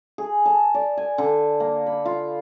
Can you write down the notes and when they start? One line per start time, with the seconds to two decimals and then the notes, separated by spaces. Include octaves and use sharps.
0.18 G#4
0.46 A5
0.75 D5
0.98 G#5
1.18 D3
1.60 A#3
1.86 B5
2.06 F4